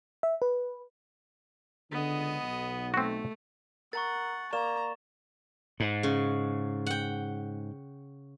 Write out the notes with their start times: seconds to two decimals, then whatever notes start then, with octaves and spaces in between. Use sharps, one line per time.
0.23 E5
0.42 B4
1.91 C#2 D3 B3 D#5
2.43 B1
2.94 A3 C4 F#4
3.93 A#4 F#5 A#5 C#6 A6
4.53 A#3 D5 A#5 C#6 E7
5.80 G#2
6.03 C#3
6.86 F#5 G5